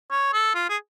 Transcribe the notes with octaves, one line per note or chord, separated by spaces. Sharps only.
C#5
A4
F4
G#4